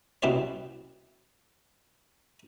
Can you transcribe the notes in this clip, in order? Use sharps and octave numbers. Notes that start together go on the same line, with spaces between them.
C2 B2 C4 E4 C5 C#5